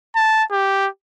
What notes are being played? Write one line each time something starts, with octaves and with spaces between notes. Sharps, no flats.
A5
G4